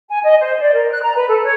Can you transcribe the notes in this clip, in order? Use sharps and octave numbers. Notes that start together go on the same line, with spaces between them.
G#5
D#5
C5
D5
A#4
F#6
A#5
B4
A4
C#5